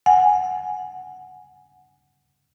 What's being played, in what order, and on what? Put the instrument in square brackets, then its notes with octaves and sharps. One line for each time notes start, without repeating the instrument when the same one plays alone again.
[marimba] F#5 G#5